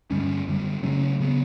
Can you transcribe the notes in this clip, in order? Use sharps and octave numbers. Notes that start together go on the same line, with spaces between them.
G2 D3 G3 C#4
F#2 D3 G3
C#3 F#3 A3 C#4
C#3 F#3 B3